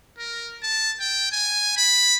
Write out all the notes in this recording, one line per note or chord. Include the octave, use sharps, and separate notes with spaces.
A#4
A5
G5
G#5
B5